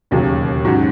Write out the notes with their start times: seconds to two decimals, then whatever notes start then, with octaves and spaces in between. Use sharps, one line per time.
0.11 E1 D#2 C#3 F#3
0.65 G#2 F#3 C#4 F#4